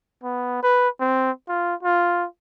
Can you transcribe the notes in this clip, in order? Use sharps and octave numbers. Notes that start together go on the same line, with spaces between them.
B3
B4
C4
F4
F4